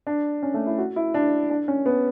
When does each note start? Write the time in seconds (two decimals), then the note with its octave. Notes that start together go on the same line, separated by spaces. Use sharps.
0.07 D4
0.43 C#4
0.54 A3
0.67 E4
0.78 F#4
0.96 E4
1.14 D4
1.50 D4
1.68 C#4
1.86 B3